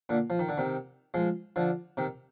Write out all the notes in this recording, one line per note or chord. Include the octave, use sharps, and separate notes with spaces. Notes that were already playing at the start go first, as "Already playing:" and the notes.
A#2 D3
F3
D#3
D3
C3 D#3
F3 G#3
D3 F3
C3 D#3